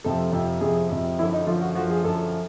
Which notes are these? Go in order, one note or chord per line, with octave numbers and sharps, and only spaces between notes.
F2 C3 F3 A4
F2 C3 F3
F2 C3 F3 G#4
F2 C3 F3
F#2 D3 F3 E4
D#4
F#2 D3 F3 F4
F#4
F#2 D3 F3 F#4
G#4
F#2 D3 F3 A4